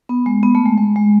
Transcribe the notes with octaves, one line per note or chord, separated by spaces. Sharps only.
B3
G#3
B3
A3
G#3
G#3
G#3